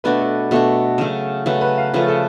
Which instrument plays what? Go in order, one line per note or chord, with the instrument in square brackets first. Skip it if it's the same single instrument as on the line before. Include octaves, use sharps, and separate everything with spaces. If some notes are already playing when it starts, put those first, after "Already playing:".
[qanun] B2 A3 D4 F#4 [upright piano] B4
[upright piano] A4
[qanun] B2 A3 D4 F#4 [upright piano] A4
[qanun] C#3 F#3 A3
[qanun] C#3 F#3 A3 [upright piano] B4
[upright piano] B4
F5
[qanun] C#3 F3 A3 [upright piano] B4
[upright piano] A4